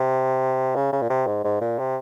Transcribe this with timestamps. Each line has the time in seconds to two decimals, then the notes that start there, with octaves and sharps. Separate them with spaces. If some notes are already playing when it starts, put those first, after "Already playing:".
Already playing: C3
0.75 C#3
0.92 C#3
1.02 A#2
1.09 C3
1.27 G#2
1.44 G#2
1.61 A#2
1.79 C3